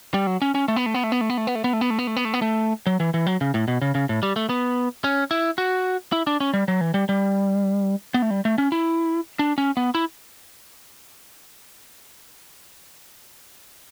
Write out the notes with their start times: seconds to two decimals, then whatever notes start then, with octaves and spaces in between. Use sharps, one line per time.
0.14 G3
0.27 F#3
0.42 C#4
0.55 C#4
0.68 A3
0.76 B3
0.86 A3
0.94 B3
1.04 A3
1.12 B3
1.21 A3
1.30 B3
1.37 A3
1.47 B3
1.55 A3
1.64 B3
1.73 A3
1.81 B3
1.90 A3
1.99 B3
2.07 A3
2.16 B3
2.25 A3
2.34 B3
2.42 A3
2.87 F#3
3.00 E3
3.14 E3
3.27 F#3
3.41 C#3
3.54 A2
3.68 B2
3.82 C#3
3.95 C#3
4.09 A2
4.23 G3
4.36 A3
4.49 B3
5.04 C#4
5.31 E4
5.58 F#4
6.12 E4
6.27 D4
6.40 C#4
6.54 G3
6.68 F#3
6.81 E3
6.94 G3
7.09 G3
8.14 B3
8.22 A3
8.30 G3
8.45 A3
8.58 C#4
8.72 E4
9.39 D4
9.58 C#4
9.77 B3
9.95 E4